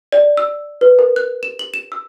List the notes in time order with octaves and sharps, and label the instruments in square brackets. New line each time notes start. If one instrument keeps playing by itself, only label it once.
[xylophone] D5
E6
B4
A#4
F#6
E7
F#7
E7
E6